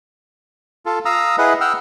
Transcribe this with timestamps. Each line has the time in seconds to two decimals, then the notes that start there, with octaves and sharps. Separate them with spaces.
0.86 F4 A4
1.05 F5 A#5 D#6 E6
1.38 E4 G#4 B4 D#5 F#5
1.61 F#5 G5 E6 F6